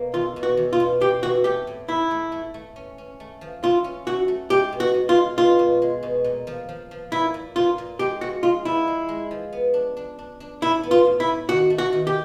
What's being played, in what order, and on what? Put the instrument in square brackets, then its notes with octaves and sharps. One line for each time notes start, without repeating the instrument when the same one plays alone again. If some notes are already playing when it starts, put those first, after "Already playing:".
Already playing: [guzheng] B2 A#3
[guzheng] E2 [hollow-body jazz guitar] F4
[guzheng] B2
[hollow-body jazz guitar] F#4
[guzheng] E2
[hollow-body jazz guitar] F4
[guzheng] B2
[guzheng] C4 [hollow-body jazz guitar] G4
[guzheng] E3 [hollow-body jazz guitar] F#4
[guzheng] A3 [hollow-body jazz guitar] G4
[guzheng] A2
[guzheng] A3 [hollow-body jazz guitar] E4
[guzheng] A3
A3
A3
C#4
C#4
A3
F3
[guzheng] E4 [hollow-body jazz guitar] F4
[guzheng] C#4
[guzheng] E4 [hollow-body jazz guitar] F#4
[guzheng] A3
[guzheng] G#3 [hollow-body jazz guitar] G4
[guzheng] B2
[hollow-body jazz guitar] F#4
[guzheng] B2
[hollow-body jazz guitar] F4
[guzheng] G#3
[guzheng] B2 [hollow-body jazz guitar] F4
[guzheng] B2
G#3
B2
A#2
F3
F3
F3
[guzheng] A#2 [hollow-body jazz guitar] E4
[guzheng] A#2
[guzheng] A#2 [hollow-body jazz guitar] F4
[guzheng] A#2
[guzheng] G#3 [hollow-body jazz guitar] G4
[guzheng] F3 [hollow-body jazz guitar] F#4
[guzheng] G#3 [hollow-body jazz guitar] F4
[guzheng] F3 [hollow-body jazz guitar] E4
[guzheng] G#3
G#3
F3
B3
D4
D4
D4
D4
[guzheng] A2 [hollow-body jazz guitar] E4
[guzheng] B3
[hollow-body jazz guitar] F4
[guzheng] A2
[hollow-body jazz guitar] E4
[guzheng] A2
[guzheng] D#3 [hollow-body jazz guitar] F#4
[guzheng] A3
[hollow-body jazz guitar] F#4
[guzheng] D#3
[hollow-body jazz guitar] G4